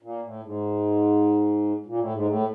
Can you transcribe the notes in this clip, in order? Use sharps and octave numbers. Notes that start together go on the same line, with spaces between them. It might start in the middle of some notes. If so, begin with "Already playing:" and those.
A#2
A2
G#2
A#2
A2
G#2
A2